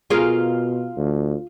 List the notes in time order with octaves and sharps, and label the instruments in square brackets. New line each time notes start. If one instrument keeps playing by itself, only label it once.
[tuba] B2 [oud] F4 G#4 A#4
[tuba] D2